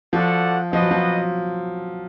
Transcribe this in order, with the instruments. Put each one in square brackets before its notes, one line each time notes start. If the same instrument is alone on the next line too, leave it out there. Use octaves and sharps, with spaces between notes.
[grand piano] F3 [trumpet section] F#4 A4 D5 F#5
[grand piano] F3 [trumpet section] F#4 B4 D#5
[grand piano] F#3
F3